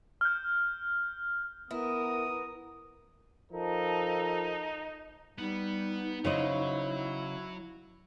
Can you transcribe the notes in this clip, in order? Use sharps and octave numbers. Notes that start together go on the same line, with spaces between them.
F6 G6
B3 E4 A#4 D#6
F3 D#4 A4 A#4
G3 B3 D#4
C#3 F#3 E4 C5 D#5